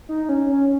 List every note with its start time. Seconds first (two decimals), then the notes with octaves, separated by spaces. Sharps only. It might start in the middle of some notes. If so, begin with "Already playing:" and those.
0.09 D#4
0.29 C#4
0.49 C#4